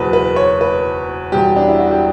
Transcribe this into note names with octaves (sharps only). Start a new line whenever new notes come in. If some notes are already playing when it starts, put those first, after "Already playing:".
Already playing: F#1 E2 B2 B4
B4
C#5
B4
E1 E2 B2 G3 G4
D4
E4
F#4
G4